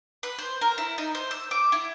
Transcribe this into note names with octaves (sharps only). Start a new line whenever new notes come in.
B4
C5
A#4
E4
D#4
C5
E6
D6
E4